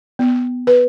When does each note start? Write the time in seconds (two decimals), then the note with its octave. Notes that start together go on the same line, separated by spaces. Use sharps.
0.19 B3
0.67 B4